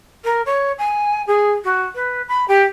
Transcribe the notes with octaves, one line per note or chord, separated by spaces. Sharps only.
A#4
C#5
G#5
G#4
F#4
B4
B5
G4